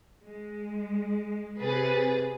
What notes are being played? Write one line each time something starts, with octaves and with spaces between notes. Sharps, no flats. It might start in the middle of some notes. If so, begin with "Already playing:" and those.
G#3
C3 G#4 B4 A6